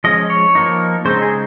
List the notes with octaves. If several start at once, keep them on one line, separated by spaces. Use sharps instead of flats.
F3 G#3 C#4 D#5
C#5
F3 A#3 D#4
C#3 G#3 C4 D#4 C5
G#4